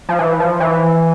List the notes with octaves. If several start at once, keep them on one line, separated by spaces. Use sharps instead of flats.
F3
E3
F3
E3